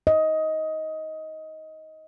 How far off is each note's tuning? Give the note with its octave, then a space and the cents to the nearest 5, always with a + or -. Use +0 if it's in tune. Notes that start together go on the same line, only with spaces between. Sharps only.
D#5 +15